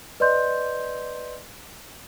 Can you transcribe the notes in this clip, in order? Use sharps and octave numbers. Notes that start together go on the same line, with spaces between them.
B4 D5 D#5 C6 G6